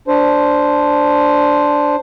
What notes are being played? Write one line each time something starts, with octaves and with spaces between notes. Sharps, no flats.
D4 C5